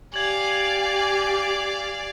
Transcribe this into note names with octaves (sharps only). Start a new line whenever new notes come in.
G4 D5 F5 G#5 G#6 F#7